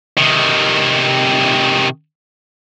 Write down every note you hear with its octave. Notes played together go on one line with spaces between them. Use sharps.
C3 D#3